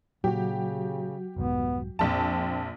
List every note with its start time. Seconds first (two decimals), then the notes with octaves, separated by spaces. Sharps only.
0.24 A#2 C#3 F#3 F#4 G4
1.36 F1 C2 G#2 B3
1.99 A#1 F2 C4 A5